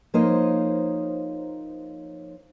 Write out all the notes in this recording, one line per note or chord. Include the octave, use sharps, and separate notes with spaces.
F3 A#3 D#4 C5 C#5 D#5